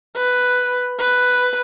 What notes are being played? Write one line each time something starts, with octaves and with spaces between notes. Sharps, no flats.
B4
B4